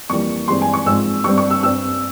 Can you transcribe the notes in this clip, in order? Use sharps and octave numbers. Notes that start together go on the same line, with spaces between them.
F2 E3 G3 A#3 C#6
G2 E3 G#3 C4 C6
G#5
C#6
G#2 F3 G#3 C4 E6
G2 G3 C4 C#6
C#6
E6
G2 G3 C4 E6